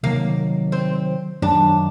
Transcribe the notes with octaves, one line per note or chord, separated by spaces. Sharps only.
C3 D#3 F#3 A#3
C4
F#2 D#3 F#3 D4